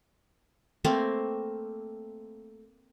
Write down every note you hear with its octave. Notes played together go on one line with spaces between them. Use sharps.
A3 A#3 C4